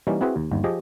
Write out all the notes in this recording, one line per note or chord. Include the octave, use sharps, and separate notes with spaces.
E3 G3 A#3 C#4 D#4
C4 E4 F#4 G#4 B4
D#2
G1 D#2
F3 G4 G#4 D#5